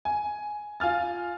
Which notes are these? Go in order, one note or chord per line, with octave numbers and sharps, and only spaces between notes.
G#5
F4 G#5 F6 A6